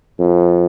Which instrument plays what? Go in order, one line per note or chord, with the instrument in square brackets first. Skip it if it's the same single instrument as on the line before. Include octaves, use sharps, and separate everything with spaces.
[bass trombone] F2